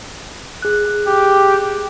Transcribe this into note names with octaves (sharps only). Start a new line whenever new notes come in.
G#4 F#6
G4